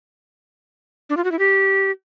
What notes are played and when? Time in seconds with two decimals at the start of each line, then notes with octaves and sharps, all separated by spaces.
1.10 D4
1.17 F4
1.24 F#4
1.32 E4
1.39 G4